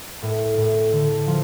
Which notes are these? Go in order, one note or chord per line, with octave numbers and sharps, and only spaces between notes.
A2
A2
D3
F3